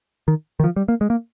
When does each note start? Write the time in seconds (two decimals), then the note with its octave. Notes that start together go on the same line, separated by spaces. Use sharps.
0.28 D#3
0.60 D#3
0.64 F3
0.76 G3
0.88 A#3
1.01 G#3
1.10 A#3